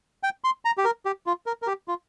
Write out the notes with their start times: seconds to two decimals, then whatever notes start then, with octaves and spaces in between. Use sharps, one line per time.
0.23 G5
0.44 C6
0.65 A#5
0.78 G4
0.85 A#4
1.05 G4
1.26 F4
1.46 A#4
1.62 A#4
1.67 G4
1.88 F4